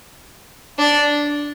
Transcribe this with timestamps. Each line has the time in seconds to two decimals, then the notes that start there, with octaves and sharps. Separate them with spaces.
0.79 D4